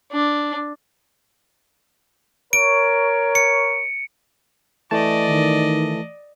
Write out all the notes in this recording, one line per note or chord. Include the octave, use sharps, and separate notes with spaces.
D4
A#4 C#5 D7
C#7
E3 A3 D5 D#5 A5
D#3